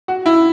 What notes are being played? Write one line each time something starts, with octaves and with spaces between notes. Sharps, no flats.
F#4
E4